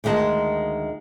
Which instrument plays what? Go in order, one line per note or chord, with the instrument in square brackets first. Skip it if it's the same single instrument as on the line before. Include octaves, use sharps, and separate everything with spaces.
[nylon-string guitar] D2 D#3 G#3 A#4 A5